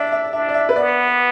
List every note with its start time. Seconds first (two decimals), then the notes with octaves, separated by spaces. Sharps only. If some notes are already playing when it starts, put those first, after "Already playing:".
Already playing: D4 D5 E5
0.12 E5
0.33 D4 E5
0.49 D5
0.54 E5
0.69 B4
0.76 B3 D5